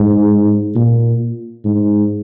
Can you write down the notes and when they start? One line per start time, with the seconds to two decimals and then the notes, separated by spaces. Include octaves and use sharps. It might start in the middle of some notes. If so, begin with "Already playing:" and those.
Already playing: G#2
0.75 A#2
1.65 G#2